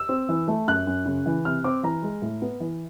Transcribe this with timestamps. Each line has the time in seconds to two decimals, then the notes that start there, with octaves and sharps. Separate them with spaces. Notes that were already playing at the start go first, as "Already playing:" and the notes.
Already playing: E6
0.09 C4
0.29 E3
0.48 A3
0.67 F#2 F#6
0.87 F#2
1.06 C#3
1.26 E3
1.45 C3 F6
1.64 C4 D6
1.83 E3 A#5
2.03 G#3
2.22 A2
2.42 B3
2.60 E3